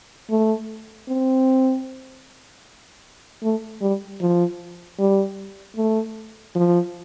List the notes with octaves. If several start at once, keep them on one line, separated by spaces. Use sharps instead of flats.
A3
C4
A3
G3
F3
G3
A3
F3